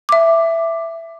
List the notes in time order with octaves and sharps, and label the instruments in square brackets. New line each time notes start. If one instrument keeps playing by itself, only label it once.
[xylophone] E5 D6